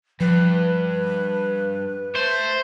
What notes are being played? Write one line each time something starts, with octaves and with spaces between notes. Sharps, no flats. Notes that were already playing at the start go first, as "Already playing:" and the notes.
G2 F3 B4
A3 C5